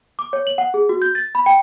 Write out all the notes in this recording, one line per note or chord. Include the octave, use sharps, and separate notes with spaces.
D6
C#5
F#7
F#5
G#4
F#4
G6
A6
B5
G5